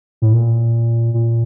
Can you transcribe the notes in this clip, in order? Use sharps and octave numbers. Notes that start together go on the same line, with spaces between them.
A2
A#2
A#2